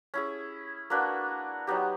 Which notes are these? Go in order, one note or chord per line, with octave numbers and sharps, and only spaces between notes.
C#4 E4 G#4
A#3 D4 F#4 B4
F#3 B3 D#4 G4